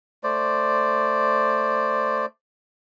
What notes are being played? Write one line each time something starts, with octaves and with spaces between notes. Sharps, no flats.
A3 C5 D5